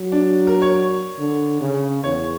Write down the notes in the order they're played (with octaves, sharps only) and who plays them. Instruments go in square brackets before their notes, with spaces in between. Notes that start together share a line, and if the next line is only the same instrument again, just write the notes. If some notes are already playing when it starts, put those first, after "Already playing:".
Already playing: [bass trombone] F#3
[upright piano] D4
A#4
C#5
[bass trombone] D3
C#3
[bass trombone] E2 [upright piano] C#5